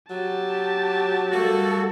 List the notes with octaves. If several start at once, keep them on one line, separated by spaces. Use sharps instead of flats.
F#3 G4 A5
G3 A3 A#3 F#4 A4